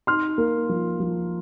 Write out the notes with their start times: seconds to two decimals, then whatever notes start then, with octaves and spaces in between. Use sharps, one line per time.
0.07 D#4 C6 F6
0.38 A#3
0.69 F3
1.00 F3